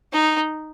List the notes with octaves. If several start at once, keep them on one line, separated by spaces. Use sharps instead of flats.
D#4